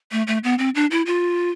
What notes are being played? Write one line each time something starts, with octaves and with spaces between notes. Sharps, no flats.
A3
A3
B3
C4
D4
E4
F4